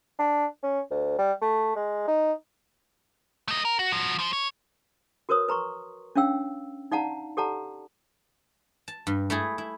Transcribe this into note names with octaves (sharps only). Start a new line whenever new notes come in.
D4
C#4
D2
G3
A3
G#3
D#4
A3 D#5
A#4
F#4
F3 F#4
F3 C5
C#5
F#4 A#4 B4 C#5 D#6
B4 A#5 C6 C#6
C#4 D4 C#5 F5 G5 E6
D#4 D5 F5 F#5 A5 A#5
G4 A4 D5 F#5 A5 A#5
A5
G2
A3 E4 G#4
E4